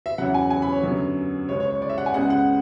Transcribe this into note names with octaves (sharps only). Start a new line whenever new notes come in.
E5
E2 C#3 F#3 F#5
G#5
G#5
B5
C#5
F#2 D3 F#3 B3
C#2 C#3 G#3 C#5
C#5
C#5
D5
E5
F#5
G#5
C#2 C#3 G#3 B3 F#5
F#5